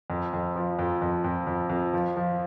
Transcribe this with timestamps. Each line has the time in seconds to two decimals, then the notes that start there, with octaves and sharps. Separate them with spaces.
0.10 F2
0.33 F2
0.56 F3
0.79 F2
1.02 F2
1.24 F2
1.47 F2
1.70 F2
1.93 F3
2.17 F3